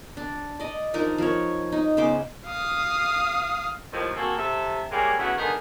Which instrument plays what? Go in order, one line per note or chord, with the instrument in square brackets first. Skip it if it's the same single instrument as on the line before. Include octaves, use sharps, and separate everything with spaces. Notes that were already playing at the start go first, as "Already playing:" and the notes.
[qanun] D4
D5 D#5
F3 D4 D#4 A#4
F3 A#4 C#5
D#4
C#3 B3 C5 D6
[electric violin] F5 D#6
[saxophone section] D#2 A2 D#3 F3
A#3 C4 F#4 G#4 A4
C3 A4 E5
G3 G#3 A#3 G4 G#4 C#5
C#3 E3 A3 B3 F#4
D3 D#3 B3 D#4 G#4 A#4